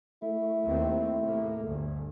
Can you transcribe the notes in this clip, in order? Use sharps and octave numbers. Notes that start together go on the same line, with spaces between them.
A3 E4
D#2 C4
A2 C3 A#3
G1 D2